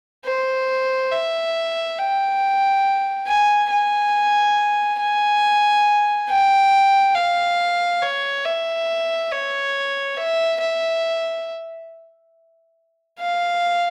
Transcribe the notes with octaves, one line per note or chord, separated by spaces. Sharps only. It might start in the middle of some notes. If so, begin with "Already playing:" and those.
C5
E5
G5
G#5
G#5
G#5
G5
F5
C#5
E5
C#5
E5
E5
F5